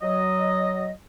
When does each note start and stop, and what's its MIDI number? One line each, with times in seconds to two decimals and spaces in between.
0.02 0.90 54
0.02 0.90 75